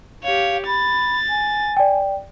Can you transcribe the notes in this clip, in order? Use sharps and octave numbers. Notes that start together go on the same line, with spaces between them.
G4 C#5 F5
B5 A6
G#5
D5 G5